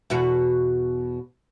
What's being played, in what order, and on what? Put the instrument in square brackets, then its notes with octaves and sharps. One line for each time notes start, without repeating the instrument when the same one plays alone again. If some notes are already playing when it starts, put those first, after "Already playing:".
[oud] E2 B2 F#4